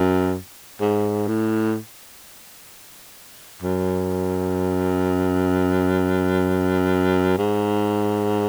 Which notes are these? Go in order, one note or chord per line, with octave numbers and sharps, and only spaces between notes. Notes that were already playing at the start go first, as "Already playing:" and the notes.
Already playing: F#2
G#2
A2
F#2
G#2